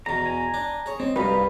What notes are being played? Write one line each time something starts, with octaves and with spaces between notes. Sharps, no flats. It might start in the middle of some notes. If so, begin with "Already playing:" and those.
E2 B2 A#5
G#5 A#5
D4
G#4 C#5
C4 D#4
C2 G2 D#4 G4 B4 F5